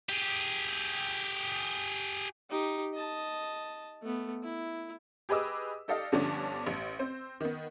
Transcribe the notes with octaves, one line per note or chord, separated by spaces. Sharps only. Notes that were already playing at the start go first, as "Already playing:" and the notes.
G4 G#4
D#4 G4
D#5 A5
A3 B3
E4
G4 G#4 B4 D#5 D6 E6
D#4 G4 A4 D5 D#5 F5
G2 D3 F3 B3 C#4 D4
A1
C4 C5
D#3 B3